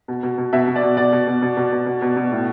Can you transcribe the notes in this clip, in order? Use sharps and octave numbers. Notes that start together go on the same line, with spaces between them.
B2
B2
B2
B2 E5
B2
D5
B2
B2 D5
B2
B2
B2
B2
B2
B2
B2
B2
A2